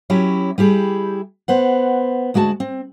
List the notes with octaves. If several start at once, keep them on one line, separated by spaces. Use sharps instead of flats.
F#3 C#4 E4 G4
G3 E4 G4 G#4
B3 C5 F#5
D2 G#3 F#4 G5 A5
C4